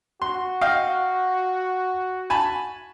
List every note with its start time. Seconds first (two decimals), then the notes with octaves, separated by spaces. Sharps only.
0.22 F#4 C6
0.61 D#5 F5 G5
2.30 G#5 A5 B5